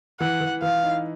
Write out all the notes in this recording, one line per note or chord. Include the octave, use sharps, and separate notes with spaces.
E3 F#5
E3
E3 F5
D#4